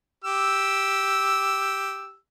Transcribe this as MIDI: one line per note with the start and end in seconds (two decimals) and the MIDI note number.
0.24 2.16 67
0.24 2.16 88